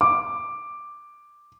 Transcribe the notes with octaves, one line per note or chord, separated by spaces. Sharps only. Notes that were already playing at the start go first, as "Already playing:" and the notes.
D6